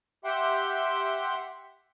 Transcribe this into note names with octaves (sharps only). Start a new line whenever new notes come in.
G4 E5 F#5 G5 C6